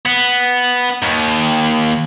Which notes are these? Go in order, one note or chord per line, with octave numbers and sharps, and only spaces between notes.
B3
D#2